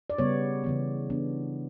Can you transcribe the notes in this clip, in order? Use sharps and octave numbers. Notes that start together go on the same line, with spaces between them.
D5
C#3 G3 B3 C#5
C#3 E3 B3
E3 B3 D4